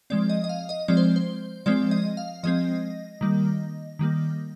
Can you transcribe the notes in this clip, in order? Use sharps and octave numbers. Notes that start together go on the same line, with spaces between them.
F3 G#3 C4 D5
D#5
D#5
F5
D#5
F3 G#3 C4 D5
C5
C5
F3 G#3 C4 D5
D#5
F5
F3 G#3 C4 D#5
D#3 G3 A#3
D#3 G3 A#3